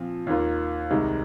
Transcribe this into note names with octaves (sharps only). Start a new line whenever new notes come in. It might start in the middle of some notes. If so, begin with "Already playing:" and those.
Already playing: A#2 F3 C4
D#2 D#3 A#3 F4
C2 C3 D#3 G#3 D#4